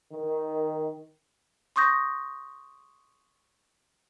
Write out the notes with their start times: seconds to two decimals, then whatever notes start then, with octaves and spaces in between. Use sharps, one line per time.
0.13 D#3
1.76 C6 C#6 D#6 G6 A#6